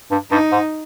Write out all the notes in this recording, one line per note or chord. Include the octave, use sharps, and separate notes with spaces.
G2
G2 D#4
G#2